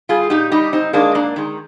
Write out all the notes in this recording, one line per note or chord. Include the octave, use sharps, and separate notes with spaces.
G3 F4 G#4
A#2 D#4 G4
G3 D#4 G4
G#2 C4 D#4
D#3 G#3 A#3 D4
G#2 A#3 D4
D#3 G#3